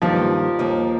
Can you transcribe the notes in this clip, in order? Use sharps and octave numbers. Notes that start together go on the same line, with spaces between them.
G2 D#3 F3 A#3
D#2 D#3 A#3